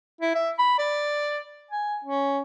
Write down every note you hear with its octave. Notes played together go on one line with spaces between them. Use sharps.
E4
E5
B5
D5
G#5
C#4